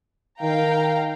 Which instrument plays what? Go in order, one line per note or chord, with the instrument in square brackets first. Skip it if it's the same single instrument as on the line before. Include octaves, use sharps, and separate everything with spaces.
[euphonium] D#3 [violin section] F5 G5 A#5